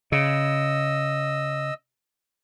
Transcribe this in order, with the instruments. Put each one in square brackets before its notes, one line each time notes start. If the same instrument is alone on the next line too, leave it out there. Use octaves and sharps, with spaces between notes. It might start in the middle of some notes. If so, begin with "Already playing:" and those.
[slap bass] C#3 [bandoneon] D#5 E6